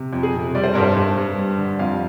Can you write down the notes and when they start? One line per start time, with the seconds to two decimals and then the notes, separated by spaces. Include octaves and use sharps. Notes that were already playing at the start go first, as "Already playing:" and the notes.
Already playing: C3
0.13 F2
0.23 G#4
0.34 C3
0.55 G3 D5
0.64 C5
0.73 G2 A#4
0.83 C5
0.96 G2
1.17 G2
1.38 G3
1.58 D3
1.79 F2 F5